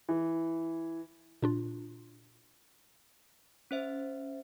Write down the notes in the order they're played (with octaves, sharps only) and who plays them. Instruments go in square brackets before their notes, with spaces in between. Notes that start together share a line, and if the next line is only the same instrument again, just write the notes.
[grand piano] E3
[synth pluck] A#2 D4 F4
[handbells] C#4 C5 E5